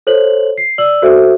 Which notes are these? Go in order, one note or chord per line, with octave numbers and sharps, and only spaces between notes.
A4 C5 C#5 F#7
C7
D5 E6 F#7
F#4 A4 C5 E5